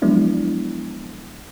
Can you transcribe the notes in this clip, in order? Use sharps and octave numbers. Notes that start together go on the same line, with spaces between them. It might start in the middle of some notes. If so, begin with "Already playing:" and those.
F3 F#3 G#3 B3 D4 E4